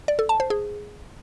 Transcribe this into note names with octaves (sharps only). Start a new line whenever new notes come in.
D5
A4
A5
C5
G#4